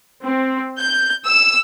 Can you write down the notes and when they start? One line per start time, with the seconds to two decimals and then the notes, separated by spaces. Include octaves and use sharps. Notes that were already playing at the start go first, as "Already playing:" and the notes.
0.22 C4
0.78 G6
1.25 E6